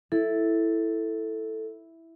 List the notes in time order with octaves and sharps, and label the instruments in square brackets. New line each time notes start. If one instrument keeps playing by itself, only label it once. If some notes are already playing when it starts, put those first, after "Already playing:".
[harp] E4 [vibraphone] A4